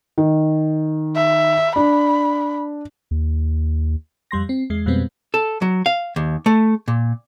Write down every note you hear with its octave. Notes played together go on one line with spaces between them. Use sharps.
D#3
E5
D4 B5
D#2
F2 G3 C6 A#6
C4
E2 G#3 C7
F2 B2 G3 G#3 B3 C4
A4
F#3
F5
D#2
A3
A#2